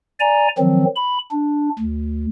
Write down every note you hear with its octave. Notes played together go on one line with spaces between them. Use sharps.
D5 G#5 A#5
D#3 F3 F#3 C4
B5
D4
D2